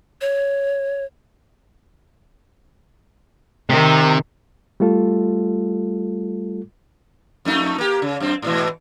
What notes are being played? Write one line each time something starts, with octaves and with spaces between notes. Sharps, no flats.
C#5
C3 D#3
G3 A3 F4 A4
F2 A3 D#4
A#3 G4
C#3
F#2 C4
G#2 B2 E3